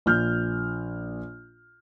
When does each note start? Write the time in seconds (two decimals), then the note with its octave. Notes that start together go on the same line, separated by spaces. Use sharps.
0.06 A#1 F6 G6